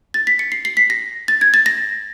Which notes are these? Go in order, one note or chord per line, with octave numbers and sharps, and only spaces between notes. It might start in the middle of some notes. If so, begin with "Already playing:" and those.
A6
B6
C#7
C7
C7
B6
A#6
A6
G#6
A6
A#6